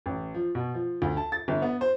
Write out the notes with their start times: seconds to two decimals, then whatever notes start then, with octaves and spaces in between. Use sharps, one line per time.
0.06 A1
0.34 F3
0.55 B2
0.74 F3
1.02 D2
1.17 A5
1.32 A6
1.48 G1
1.62 B3
1.81 C5